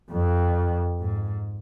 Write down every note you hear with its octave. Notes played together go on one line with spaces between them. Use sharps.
F2
G#2